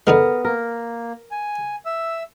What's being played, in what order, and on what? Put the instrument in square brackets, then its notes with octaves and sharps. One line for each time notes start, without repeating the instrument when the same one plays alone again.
[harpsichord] D3 D#3 G#3 [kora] B3 A#4
[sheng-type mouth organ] A#3 [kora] A#4
[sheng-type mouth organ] G#5
E5 E6